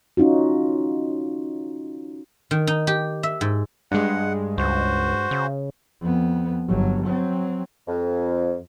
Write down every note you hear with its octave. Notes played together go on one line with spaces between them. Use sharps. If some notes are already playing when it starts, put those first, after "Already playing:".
C#4 D#4 F4 F#4
D#3
D#4
G4
E5
G#2
G2 G#3 F#5
C#2 F#4 C5
C#3
F2 B3
G1 F#3
F#3 C4
F2